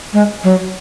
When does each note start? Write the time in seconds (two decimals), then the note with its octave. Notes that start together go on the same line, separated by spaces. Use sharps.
0.13 G#3
0.44 F#3